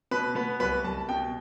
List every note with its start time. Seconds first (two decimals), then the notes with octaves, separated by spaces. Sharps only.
0.11 B2 B4
0.35 B3 B4
0.60 C2 B4
0.84 C2 A5
1.09 B2 G5